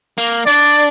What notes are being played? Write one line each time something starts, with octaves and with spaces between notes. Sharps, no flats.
A#3
D4 D5